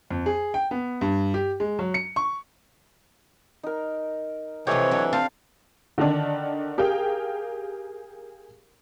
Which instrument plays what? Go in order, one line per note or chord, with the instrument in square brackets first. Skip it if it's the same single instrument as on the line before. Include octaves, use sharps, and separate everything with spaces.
[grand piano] F2
G#4
G5
B3
G2
G4
G#3
F#3
C#7
C#6
[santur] D#4 A#4
[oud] C3 F3 [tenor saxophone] E3 [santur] G4 A4 D#5 [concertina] C#5
[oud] F#3 [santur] D4
[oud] C4 [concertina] F5 [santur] A5
[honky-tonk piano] D3 D#3 D4
G4 G#4 A#4 F5 G5